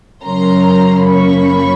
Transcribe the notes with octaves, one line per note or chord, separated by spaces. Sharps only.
F#2 C#3 F#3 A#3 C#4 A#5 C6
B5 C#6